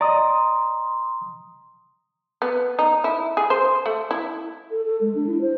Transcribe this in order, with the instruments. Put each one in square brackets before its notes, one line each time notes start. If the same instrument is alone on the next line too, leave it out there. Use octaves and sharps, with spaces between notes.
[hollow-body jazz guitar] D5 D#5 [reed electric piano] A#5 D#6 [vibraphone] C6
[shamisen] B3
D#4
E4
G#4
C5
A3
E4
[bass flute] A4
A4
G#3
D4
E4
C5